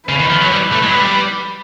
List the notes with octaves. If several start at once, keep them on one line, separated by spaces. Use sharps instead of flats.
C#3 B4
D#3
F3
F#3
G3
A3
G#3
F#3
G3